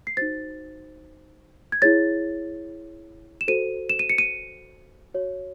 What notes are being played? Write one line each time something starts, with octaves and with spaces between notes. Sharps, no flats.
C7
D#4 F#4 C5 A6
G#6
E4 G#4 C#5 A6
E7
F#4 A4 C5 D#7
E7
D#7
C#7
D#7
F#4 C#5